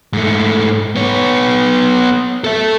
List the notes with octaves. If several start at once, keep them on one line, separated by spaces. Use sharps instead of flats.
G#2 A3
B3 C#5
A4 E5